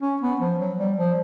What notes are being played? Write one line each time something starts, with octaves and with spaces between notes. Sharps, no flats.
C#4
B3
F3
F#3
G3
F3